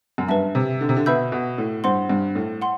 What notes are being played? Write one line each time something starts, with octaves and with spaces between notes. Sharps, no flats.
F#2
G2 B4 E5 A5
C3
D3
C3
D3
B2 B4 E5 B5 E6 G6
B2
A2
G2 C5 F#5 C6
G2
A2
F#5 C6